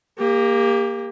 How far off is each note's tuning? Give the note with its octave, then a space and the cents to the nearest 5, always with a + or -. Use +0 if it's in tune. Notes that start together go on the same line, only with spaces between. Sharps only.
A#3 +0 G4 +30